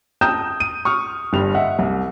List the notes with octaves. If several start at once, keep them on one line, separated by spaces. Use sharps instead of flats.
G5 A5 A#5 D#6 G6 E7
D#7
C#6 D#6 F6
G1 G3 F7
D#5 E5 F#5
C2